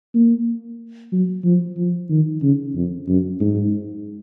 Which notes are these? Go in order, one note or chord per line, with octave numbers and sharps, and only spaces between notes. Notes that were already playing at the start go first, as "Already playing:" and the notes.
A#3
F#3
F3
F3
D#3
C#3
F2
F#2
G#2